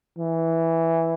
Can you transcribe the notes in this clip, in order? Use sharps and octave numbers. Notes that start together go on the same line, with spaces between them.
E3